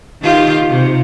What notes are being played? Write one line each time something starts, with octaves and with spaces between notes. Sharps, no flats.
D#3 F4 G4
C3